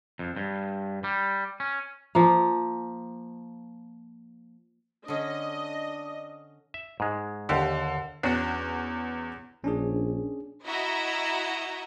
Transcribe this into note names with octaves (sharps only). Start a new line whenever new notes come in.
F2
G2
G3
C#4
F3 A#3
D3 C#4 D4 D#5
E5
G#2 G#3
D#2 D3 G4
E2 C#4 D4 F#4
A#1 C#4 D4 G#4
E4 F#4 D#5 E5 A#5